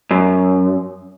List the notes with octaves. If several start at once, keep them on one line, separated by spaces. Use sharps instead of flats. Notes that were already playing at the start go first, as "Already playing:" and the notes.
F#2